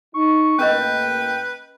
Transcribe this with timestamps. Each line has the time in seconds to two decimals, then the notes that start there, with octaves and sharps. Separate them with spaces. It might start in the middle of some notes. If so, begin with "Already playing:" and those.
0.14 D#4 C#6
0.59 A1 A#3 C#4 A#4 B4 D#5 G5